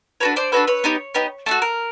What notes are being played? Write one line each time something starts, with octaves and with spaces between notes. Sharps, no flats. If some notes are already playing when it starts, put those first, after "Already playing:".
D4 F#4 A4 B4 C#5
C5 D5
D4 F#4 A4 B4 C#5
B4 C#5
B3 D#4 G4
B3 D#4 G4
A3 D4 F#4 A4
A#4